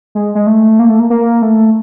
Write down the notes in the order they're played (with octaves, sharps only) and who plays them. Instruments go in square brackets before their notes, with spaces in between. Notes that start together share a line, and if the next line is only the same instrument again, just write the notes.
[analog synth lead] G#3
G#3
A3
A#3
A3
A#3
A#3
A3